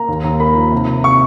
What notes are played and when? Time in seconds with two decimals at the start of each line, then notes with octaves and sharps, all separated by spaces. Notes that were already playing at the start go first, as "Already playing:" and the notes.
Already playing: A#3 A#5
0.08 D#2
0.24 D#2
0.40 A#3 B5
0.56 F3
0.72 C3
0.88 C3
1.04 C3 C#6